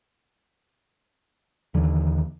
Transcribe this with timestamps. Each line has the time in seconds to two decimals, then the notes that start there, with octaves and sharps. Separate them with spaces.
1.74 D#2 D3 E3